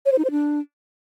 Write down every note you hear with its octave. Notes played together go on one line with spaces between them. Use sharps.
C#5
C5
D#4
C5
D4